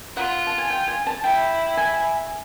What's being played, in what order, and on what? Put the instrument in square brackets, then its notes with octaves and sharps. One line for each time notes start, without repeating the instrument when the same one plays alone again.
[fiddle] F4 [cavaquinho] F#5
[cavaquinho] A5
G#5
G5
G#5
A5
[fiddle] E4 [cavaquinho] G5
[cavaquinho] G#5